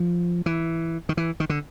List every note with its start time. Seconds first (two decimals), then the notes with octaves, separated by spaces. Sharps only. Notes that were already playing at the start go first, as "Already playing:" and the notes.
Already playing: F3
0.46 E3
1.09 D#3
1.17 E3
1.40 D#3
1.49 D3